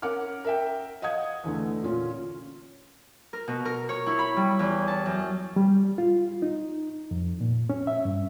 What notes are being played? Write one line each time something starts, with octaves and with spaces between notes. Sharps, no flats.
C#4 A#4 F#5 D6 F6
A#4 E5 G5
D#5 F5 F#5 D#6 G#6
E2 D3 A3
A#2 C#4 F4
A#4
B2
A#4
C#5
E4
B5
G3
E2
A5
F#2
G3
F4
D#4
F2
A#2
C#4
E5
G2